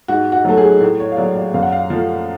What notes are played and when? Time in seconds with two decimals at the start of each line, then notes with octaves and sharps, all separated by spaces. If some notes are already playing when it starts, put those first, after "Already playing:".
0.08 G#2 F#4
0.32 F#4
0.45 F#3 A3 A4
0.58 G#4
0.81 A2
1.00 C#5
1.12 F5
1.17 F#3 A3 D5
1.35 D5
1.54 F#2 F5
1.63 F#5
1.72 F5
1.90 F3 A3